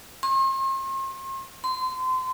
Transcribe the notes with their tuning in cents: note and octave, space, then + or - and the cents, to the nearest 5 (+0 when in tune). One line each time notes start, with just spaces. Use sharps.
C6 +45
C6 -30